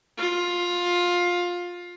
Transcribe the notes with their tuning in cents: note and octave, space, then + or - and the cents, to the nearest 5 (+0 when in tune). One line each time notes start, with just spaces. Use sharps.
F4 +15